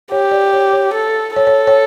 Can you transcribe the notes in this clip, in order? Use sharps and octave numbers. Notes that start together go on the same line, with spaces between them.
G4 C#5
D5
C#5
C#5
A4
A4 C#5
C#5
C#5